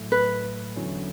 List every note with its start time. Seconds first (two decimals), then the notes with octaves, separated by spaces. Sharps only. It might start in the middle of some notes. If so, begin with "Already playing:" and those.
Already playing: A2 F#3 A3
0.12 B4
0.76 E2 D3 F#3 C#4 E4